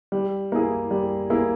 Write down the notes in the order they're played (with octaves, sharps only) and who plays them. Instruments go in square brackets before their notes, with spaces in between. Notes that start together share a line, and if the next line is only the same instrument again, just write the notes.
[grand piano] G3
A#3 E4 G#4
G3
A#3 E4 G#4